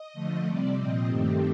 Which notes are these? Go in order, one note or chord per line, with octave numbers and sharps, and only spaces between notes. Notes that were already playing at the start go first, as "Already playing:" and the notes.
Already playing: D#5
D3 F3 A3
C3 G3 C4 D5
A#2 F3 C4 D#5
G2 D#3 A3 C4 G4